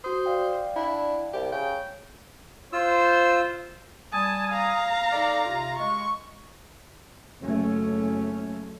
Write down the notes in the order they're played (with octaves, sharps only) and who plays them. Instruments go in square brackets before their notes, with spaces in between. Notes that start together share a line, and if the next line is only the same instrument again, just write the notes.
[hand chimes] F#4 D#6 [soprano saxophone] C5
[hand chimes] D5 F5 G5
[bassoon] D4 [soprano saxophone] E4
[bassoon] C2 [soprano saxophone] G4
[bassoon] C#3 [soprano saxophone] G5
[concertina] F4 E6 [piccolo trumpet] C5
[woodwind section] G3 G#5 D#6 [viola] A5
[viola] F5 A#5
[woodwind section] D#4 A4 D5
C3 F4
[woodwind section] G#3 [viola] C#6
[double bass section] F#1 A3 C#4